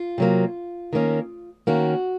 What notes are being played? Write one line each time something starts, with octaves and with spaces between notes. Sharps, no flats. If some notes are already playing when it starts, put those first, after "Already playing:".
Already playing: F4
C3 F#3 A#3
D#3 A#3 C#4
D#3 A#3 C#4 F#4